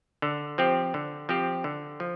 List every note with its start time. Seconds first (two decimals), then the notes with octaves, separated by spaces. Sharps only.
0.22 D3
0.58 F3 C4 G4
0.94 D3
1.29 F3 C4 G4
1.64 D3
2.00 F3